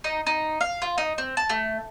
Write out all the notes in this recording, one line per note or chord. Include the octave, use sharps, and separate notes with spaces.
D#4
D#4
F5
F4
D#4
C4
A5
A3